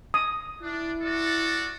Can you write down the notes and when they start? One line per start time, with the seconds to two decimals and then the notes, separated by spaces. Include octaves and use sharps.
0.14 D#6
0.62 D4 E4
1.02 F#4 A4 D5